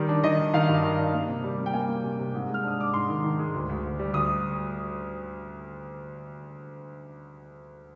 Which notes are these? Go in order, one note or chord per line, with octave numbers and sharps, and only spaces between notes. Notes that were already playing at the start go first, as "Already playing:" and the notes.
Already playing: D#3 G3
D4
D#3 D#5
D#3
D#3 F5
G2
D#3
D4
A#3
C3
G3
A#3
G5
A#3 G#5
A#3
C3
C3
G#2
G#3
F6
D4 D#6
D4 D6
G#2 C6
D#3
D#3
G#3
D2
D2
D2
G3
D2 D#6